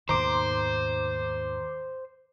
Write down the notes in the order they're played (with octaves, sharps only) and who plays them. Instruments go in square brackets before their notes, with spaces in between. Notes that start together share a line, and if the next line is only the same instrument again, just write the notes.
[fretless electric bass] D#2 B2 D#3 [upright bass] G#2 [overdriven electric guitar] C5 [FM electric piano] A#5 C6 D6